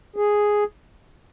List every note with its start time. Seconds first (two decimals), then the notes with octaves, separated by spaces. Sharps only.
0.16 G#4